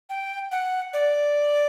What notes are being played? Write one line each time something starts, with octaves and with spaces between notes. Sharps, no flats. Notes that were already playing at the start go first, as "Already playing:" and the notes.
G5
F#5
D5